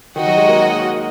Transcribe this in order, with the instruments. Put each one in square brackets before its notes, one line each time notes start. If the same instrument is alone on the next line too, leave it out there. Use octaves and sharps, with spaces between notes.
[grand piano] D#3 [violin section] F#4 D#5 F#5
[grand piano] F#3
G#3
A#3